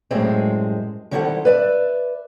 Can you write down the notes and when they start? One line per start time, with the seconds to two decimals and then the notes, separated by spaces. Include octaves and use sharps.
0.11 F#2 A2 G3 G#3 C4
1.11 D#3 G3 C4 E4 A4 F#5
1.45 B4 D5 E5